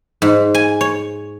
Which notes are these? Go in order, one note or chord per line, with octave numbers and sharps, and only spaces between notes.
G#2
G#5
C#5